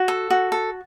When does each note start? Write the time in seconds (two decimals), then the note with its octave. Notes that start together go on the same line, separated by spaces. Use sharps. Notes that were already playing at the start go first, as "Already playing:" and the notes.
Already playing: F#4
0.08 A4
0.30 F#4
0.52 A4